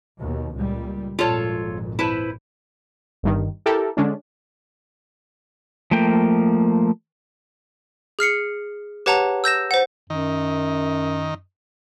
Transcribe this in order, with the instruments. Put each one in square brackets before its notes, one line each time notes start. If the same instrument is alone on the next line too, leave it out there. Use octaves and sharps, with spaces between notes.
[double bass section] D#2 B2
C#2 A#2 G3
[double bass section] G#1 F2 A#2 [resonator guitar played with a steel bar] F4 A4 C#5
[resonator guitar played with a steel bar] E4 B4 C5
[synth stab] G1 G2 D#3
E4 G4 A4 A#4
D3 G#3 C#4 D4
[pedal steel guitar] F3 A3 A#3 G5
[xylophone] G#4 F6 C7 C#7
G4 B4 C#5 F#5 A5 A#5
E6 G6 A#6 E7
C5 F#5
[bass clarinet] F#2 [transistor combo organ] D#3